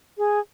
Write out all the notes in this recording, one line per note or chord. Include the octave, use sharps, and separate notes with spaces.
G#4